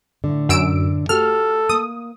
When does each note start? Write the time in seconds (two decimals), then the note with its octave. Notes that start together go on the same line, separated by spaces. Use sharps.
0.24 A2 D3
0.49 F#2 E6 D7
1.09 A3 F#4 G4 A4 F6
1.69 A#3 D#6